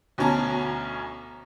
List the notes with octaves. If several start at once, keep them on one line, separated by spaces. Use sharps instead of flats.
D2 B2 C#4 A5 A#5